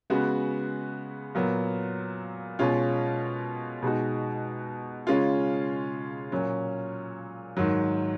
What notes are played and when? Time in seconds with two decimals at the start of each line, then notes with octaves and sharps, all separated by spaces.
0.10 C#3 G#3 B3 F#4
1.35 A#2 F#3 B3
2.59 B2 G#3 C#4 F4
3.83 B2 G#3 D#4 F#4
5.07 C#3 G#3 C#4 F4
6.32 A#2 F#3 C#4
7.57 G#2 D#3 F#3